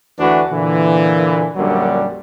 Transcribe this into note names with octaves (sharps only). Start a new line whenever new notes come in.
D2 E3 A3 D4 F#4 B4
A#2 D3 E3
A#1 F#2 A#2 D3 F#3 G3